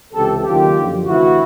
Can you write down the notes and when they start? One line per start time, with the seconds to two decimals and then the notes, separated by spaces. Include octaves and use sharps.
0.13 C#2 C3 E3 G4 A4
0.43 D#2 D#3 F#3 F4 G4
0.75 F#2 D3 F3
1.05 D2 C3 E3 E4 F#4